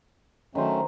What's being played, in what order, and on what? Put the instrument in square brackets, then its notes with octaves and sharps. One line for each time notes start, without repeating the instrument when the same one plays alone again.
[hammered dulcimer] D#3 C5 [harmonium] F#3 A3 C#4